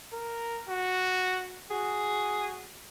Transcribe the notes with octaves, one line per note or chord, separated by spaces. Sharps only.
A#4
F#4
F#4 G#4